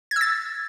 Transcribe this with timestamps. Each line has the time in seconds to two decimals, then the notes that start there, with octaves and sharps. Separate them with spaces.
0.11 G#6
0.16 E6
0.21 A6